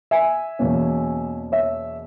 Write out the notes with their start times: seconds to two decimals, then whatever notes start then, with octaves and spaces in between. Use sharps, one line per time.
0.11 E5 G#5
0.59 E2 B2 F#3 A#3 C#4
1.52 C#5 E5